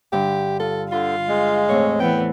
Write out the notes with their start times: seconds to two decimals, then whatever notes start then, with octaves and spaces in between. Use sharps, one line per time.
0.13 G2 D3 G4
0.60 F4 A4
0.92 D3 F4 B4 F5
1.28 G#3
1.69 E2 A2 C4 C#5
2.00 E3 B3 G5